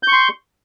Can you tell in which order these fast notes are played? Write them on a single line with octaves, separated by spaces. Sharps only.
G6 C#6 C6